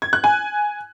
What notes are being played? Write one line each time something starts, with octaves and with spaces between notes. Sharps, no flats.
G#6
F#6
G#5